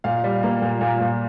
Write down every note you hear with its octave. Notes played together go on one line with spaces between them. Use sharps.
A#2 F5
G3
A#3
A#2
A#2
A#2